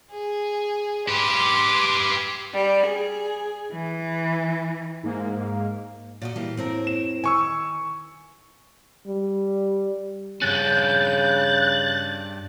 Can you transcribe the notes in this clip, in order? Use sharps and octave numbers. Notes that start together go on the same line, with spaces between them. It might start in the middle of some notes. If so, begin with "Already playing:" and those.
G#4
G4 B4 C6 D6
G3
G#4
E3
G#2 A#3
A#2 F#4 D#5
E3 G3 A#3
A2 C4 A#4
E7
D#3 G#5 C#6 E6
G3
G2 C#3 C#4 F#6 G6 A6